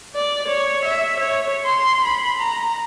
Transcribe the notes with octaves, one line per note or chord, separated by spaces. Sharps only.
D5
C#5
E5
C#5
C6
B5
A#5